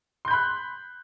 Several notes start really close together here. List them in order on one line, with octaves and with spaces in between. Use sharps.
C6 G6 B5 F#6